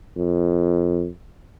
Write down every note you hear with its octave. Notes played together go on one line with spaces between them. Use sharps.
F2